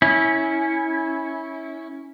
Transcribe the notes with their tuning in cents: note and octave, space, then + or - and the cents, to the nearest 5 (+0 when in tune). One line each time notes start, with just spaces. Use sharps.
C#4 +0 E4 -20